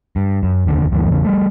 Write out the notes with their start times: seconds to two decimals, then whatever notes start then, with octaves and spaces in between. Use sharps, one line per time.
0.16 G2
0.43 F#2
0.66 F1 D#2 D3
0.92 D2 G2 E3 A3
1.10 E2 C#3
1.25 G3 A3